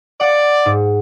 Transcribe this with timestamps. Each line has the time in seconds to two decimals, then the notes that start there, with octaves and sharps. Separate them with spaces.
0.21 D5 F#5
0.66 G#2